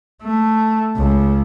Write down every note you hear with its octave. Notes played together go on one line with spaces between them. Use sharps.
A3
C#2